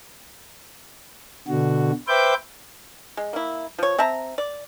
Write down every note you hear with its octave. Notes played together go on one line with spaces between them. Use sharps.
B2 D3 F#4
B4 C5 E5 G5 D6 G6
G#3
A#3 E4
F3 C#5
C4 E5 A5 A#5
D5